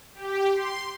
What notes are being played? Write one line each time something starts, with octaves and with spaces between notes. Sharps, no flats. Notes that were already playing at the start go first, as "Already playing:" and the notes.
G4
C6